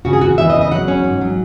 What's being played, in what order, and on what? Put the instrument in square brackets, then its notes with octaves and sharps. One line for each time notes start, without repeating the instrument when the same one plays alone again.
[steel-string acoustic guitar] C#3 F#4
G#4
E2 F#4
E3 E5
D#5
C#3
D#5
F#3 F#5
C#4
G#2
F#3